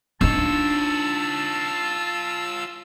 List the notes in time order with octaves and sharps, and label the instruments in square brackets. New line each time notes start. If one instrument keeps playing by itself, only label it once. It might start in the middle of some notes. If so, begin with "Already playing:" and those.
[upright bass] D4 D#4 [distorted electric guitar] F4 C#5 [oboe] A5 [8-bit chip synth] E6